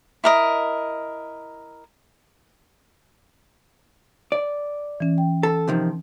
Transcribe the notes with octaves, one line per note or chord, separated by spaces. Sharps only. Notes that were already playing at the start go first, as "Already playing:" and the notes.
E4 A#4 D#5
D5
E3 C#4
G5
A4
C3 D#3 F3